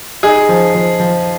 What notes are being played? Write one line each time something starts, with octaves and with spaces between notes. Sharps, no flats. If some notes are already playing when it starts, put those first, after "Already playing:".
D#4 G#4
F3
F3
F3